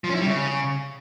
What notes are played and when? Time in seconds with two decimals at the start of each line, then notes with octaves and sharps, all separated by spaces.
0.04 F3
0.10 C#4
0.15 E4
0.21 G3
0.26 C#3